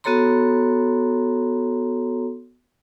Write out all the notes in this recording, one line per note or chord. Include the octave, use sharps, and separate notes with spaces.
B3 F#4 A4 C#5 A#5 C6